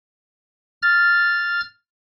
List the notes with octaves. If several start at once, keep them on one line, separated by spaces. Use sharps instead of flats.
F6 A6